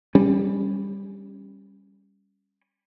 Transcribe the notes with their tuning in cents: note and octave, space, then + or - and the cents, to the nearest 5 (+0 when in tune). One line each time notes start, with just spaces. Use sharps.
G3 +15 C#4 +0